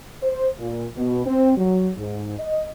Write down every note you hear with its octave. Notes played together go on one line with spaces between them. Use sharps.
C5
A#2
B2
C4
F#3
G#2
D#5